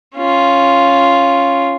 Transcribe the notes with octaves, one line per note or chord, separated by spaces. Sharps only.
C#4 F4